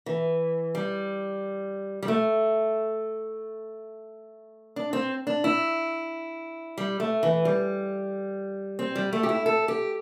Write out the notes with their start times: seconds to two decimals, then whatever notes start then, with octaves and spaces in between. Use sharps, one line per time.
0.06 E3
0.75 G3
2.03 G3
2.08 A3
4.76 D4
4.93 C4
5.27 D4
5.44 E4
6.78 G3
7.00 A3
7.23 E3
7.45 G3
8.79 C4
8.96 G3
9.13 A3
9.23 G4
9.29 E4
9.46 A4
9.68 G4